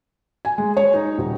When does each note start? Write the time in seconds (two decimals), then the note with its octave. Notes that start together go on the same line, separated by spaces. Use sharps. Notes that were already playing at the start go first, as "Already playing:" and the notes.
0.45 G#5
0.58 G#3
0.77 C#5
0.94 D#4
1.18 D#1